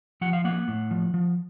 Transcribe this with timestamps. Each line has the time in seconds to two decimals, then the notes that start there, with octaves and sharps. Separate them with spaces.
0.21 F3 F#5
0.33 F5
0.44 A#3 F#5
0.68 A2
0.91 F3
1.14 F3